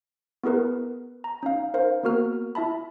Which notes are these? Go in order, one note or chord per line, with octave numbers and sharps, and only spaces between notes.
B3 E4 G#4 A#4 B4
A#5
C#4 D#4 F5
D#4 A#4 C5 F5
A#3 B3 F#4 A#4 F6
E4 E5 A5 B5